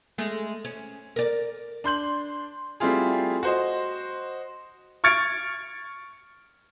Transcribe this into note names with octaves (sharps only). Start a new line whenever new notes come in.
G#3 A3
C#4
A#4 D5
D4 C6 G6 F#7
G3 A3 C4 E4 F4 G#4
F#4 C5 D#5
C#6 F6 G#6 A6 C#7 D7